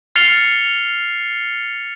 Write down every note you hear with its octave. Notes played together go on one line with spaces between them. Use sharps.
F6 A6 C7 C#7 F7 G7